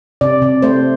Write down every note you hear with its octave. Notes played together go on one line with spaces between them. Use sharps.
C3 D5
C3
A3 C5